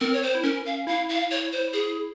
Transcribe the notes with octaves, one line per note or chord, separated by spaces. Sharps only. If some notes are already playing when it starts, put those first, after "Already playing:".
C4 A#4
C#5
C5
E4
C#4 A#4
F5
E4 F5
F5
C#5
C5
G#4